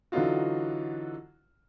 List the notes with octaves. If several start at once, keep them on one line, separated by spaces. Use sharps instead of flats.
D3 E3 F#3 D#4 F4 F#4